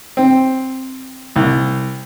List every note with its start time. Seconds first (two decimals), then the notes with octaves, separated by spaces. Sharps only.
0.17 C4
1.36 C2